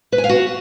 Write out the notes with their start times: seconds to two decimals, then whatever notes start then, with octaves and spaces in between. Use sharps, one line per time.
0.12 B4
0.18 G#5
0.24 F5
0.29 F#4